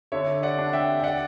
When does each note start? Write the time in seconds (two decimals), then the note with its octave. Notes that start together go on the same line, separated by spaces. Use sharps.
0.12 D3 C#5 E5
0.43 D5 F#5
0.59 D4
0.73 E5 G5
0.99 G5
1.04 D5 F#5